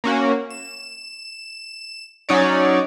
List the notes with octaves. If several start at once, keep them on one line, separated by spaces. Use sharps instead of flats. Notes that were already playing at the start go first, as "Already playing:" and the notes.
A#3 C#4 F#4
E7
F#3 C#4 D#4 C#5 D5